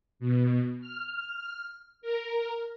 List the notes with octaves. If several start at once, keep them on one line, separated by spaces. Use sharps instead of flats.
B2
F6
A#4